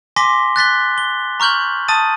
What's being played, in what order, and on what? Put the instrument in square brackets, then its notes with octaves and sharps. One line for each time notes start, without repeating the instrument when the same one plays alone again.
[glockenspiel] G#5 C6 D6 A#6 B6 G7
F#6 A6 B6 G7
G7
A#5 C#6 F6 G6 F#7
A5 D#6 A6 D#7